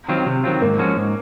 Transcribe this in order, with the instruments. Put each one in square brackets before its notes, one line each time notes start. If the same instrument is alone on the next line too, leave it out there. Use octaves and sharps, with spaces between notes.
[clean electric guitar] D#3 F#3 C4 F4
C3
D#3 F#3 C4 F4
[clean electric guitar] G#2 [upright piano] A#3
[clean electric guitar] F3 G#3 C#4 F#4
G#2